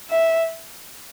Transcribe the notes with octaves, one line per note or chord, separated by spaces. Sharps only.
E5